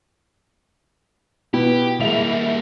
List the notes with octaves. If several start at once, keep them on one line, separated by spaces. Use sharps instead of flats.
B2 E4 G4
G3 G#3 A#3 E5 F7